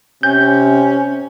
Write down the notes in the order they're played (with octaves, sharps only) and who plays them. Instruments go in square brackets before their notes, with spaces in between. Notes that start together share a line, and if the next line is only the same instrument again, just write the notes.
[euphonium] C3 [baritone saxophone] C#4 [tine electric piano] G6